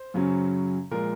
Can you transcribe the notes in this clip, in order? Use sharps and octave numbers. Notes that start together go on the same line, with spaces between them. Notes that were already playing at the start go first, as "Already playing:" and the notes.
Already playing: C5
F#2 C#3 F#3 C#4
A#2 F3 G#3 A#4